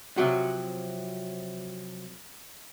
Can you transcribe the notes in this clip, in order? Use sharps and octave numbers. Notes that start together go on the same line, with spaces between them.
C3 F3 F#3 F#4